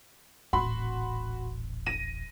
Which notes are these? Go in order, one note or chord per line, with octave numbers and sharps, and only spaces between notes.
D#1 A1 F#4 B5 C6
A#6 D#7